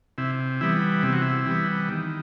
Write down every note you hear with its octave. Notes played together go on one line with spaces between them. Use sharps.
C3 E4
E3 G3 B3 E4
C3 E4
F#4
E4
E3 G3 B3
D#3